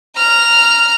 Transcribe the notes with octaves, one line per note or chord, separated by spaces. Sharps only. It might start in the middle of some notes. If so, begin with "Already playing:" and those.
A#5 F6